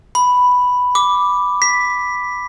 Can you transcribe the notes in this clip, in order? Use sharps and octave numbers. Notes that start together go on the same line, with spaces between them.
B5
D6
B6